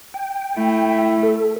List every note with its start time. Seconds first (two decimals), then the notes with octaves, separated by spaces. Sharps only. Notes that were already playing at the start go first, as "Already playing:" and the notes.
0.14 G5
0.57 A3 E4
1.23 A4